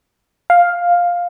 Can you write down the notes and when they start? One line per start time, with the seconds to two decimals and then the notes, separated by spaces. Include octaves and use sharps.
0.50 F5